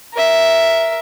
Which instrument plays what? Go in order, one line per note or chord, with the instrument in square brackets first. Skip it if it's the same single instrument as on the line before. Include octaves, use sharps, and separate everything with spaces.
[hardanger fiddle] A#4 E5